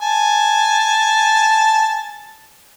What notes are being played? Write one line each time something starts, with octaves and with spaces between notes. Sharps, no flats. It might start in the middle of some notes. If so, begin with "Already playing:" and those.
G#5 A5